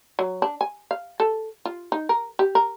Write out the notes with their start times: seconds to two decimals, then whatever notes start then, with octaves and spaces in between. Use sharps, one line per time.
0.19 F#3
0.42 D4
0.61 G#5
0.91 F5
1.20 A4
1.65 F4
1.92 D#4
2.09 A#4
2.39 G4
2.55 A#4